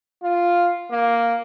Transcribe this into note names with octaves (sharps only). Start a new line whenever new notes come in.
F4
A#3